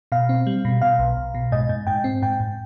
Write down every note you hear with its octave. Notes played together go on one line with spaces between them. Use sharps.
B2 F5
C4
G3
B2
B2 F5
B1
B1
B2
G#2 D#5
G#2
G#2 G5
C4
G#2 G5
G#2